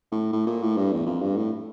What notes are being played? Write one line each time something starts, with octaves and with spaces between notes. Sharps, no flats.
A2
A2
A#2
A2
G2
E2
F2
G2
A2